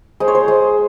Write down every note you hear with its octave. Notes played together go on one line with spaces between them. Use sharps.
G#3 C5
C#5
C5
G#3